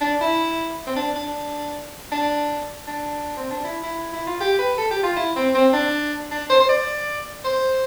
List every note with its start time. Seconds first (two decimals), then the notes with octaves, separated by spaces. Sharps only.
0.01 D4
0.21 E4
0.87 C4
0.96 D4
1.16 D4
2.12 D4
2.87 D4
3.37 C4
3.50 D4
3.64 E4
3.83 E4
4.13 E4
4.27 F4
4.40 G4
4.59 B4
4.78 A4
4.91 G4
5.03 F4
5.17 E4
5.36 C4
5.55 C4
5.73 D4
6.31 D4
6.50 C5
6.60 C5
6.69 D5
7.45 C5